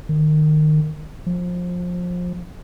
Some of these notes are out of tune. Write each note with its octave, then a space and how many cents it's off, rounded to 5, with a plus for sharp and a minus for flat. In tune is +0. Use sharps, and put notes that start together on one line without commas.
D#3 -25
F3 +25